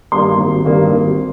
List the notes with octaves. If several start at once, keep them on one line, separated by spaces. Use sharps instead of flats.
G2 D#3 G3 A#3 C6
G#1
G2 D#3 G3 A#3
G#1